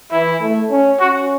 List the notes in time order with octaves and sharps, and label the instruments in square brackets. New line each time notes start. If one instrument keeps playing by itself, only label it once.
[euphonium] E3 [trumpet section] E4
[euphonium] A3
C#4
[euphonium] C#4 [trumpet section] F#4